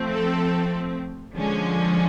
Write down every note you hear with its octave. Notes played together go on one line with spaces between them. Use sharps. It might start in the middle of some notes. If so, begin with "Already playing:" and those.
Already playing: F3 A3 C4
A4
D3 F3 G#3 C#4